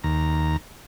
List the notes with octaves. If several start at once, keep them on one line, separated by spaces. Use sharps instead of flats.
D#2 A#5